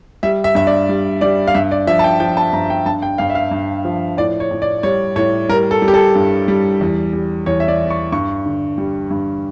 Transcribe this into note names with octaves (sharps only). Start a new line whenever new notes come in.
G3 E5
E5
G2 E5
D5
G3
G3 D5
F5
G2 E5
D5
F3 E5
A5
G5
F3 G5
A5
G2 A#5
G5
G2 A5
G5
G2 F5
E5
F5
G2
F3
A2 D5
C#5
A2
D5
G3 C#5
A2 C#5
G3 A#4
A4
G3
G4
A4
G2
G3
E2
G3
E2 C#5
E5
D5
E3
C#6
G2 C#6
D3
G3
G2